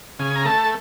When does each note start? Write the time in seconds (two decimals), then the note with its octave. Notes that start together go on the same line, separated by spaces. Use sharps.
0.19 C#3 G#5
0.36 A#5
0.45 A3 A5